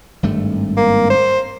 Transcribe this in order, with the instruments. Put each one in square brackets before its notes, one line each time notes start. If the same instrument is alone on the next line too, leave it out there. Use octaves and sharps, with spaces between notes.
[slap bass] G#1 G2 A3
[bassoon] A#3
C5